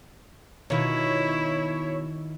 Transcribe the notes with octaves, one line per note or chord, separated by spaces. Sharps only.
B2 D#3 E4 F4 C#5